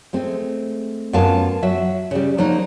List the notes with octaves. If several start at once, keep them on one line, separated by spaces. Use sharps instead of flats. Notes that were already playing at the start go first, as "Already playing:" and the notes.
G#3 A3 C4
F#2 B3 F4 F5 G#5 A5
F#3 E5
C#3 G3
F3 F#3 A#3 D#4 F#4